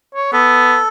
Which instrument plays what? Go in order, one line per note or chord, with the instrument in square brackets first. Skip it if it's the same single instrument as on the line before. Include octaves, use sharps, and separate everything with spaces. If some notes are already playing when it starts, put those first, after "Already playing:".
[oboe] C#5
[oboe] B3 [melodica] A4